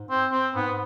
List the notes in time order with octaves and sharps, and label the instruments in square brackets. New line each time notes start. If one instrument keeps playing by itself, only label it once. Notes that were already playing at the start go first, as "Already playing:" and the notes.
Already playing: [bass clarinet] G#2
[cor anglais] C4
C4
[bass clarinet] G#2 [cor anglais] B3